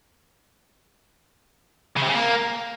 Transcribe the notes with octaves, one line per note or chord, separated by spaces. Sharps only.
C#3
C3
C#3
A#3